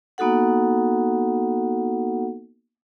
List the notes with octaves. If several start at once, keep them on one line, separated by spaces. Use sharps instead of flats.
A#3 B3 D#4 F#4 A4 F#5